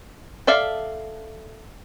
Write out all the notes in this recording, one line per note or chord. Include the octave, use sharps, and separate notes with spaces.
A4 D5 E5 F5